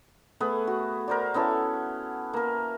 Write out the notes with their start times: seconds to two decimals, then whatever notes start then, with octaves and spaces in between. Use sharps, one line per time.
0.40 A3 B3 G#4 B4
0.67 F#4
1.08 A#4 C5 D5
1.34 B3 C#4 E4 A4
2.33 A#3 A#4